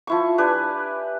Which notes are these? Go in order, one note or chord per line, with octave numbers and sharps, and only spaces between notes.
F3 E4 C#6
D4 G4 B4 G#5